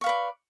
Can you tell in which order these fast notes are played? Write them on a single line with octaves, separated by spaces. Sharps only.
C#6 F5 B4 D5